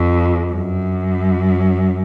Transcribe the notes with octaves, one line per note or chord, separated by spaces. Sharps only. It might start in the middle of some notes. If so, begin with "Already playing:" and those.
Already playing: F2
F#2